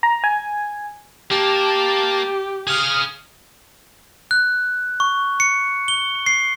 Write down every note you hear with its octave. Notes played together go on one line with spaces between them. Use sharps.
A#5
G#5
A#3 G4 A5
G#4 F5 D#6 F6
F#6
C#6
C#7
G7
C7